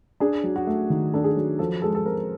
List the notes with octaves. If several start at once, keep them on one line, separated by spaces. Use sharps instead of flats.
D4 G#4
F#3
F#4
A3
D#3
D4 A4
G#4
F#3
F3 A4
G#3 A4
A4
C4 A#4